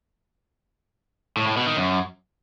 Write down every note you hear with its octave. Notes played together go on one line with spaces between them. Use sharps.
A2
A2
B2
D#3
F#2